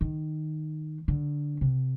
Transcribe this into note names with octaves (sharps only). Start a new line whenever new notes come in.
D#3
D3
C3